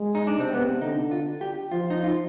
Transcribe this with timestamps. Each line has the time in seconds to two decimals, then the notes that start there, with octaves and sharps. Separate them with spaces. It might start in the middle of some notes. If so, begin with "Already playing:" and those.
Already playing: G#3
0.15 D#4
0.27 D4
0.38 C3 C4
0.53 B3
0.82 D3 D#4
1.11 F4
1.41 G4
1.72 F3 F4
1.90 D#4
2.04 F4